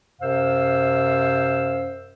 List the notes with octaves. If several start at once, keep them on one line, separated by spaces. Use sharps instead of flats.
F#2 C3 C5 F5 E6